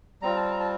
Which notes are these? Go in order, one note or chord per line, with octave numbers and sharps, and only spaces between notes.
G3 C4 F4 A#5
A5
A#5
A5